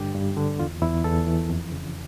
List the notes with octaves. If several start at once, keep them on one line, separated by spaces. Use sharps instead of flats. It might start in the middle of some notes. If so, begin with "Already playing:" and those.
Already playing: G2 D3 G4
G2
D3
E2 F4
E2 E4
E2 A4
E3
F2
C#3